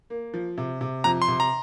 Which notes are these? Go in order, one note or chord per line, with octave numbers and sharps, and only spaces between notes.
A#3
F3
C3
C3
F2 A#5
C6
C3
A#5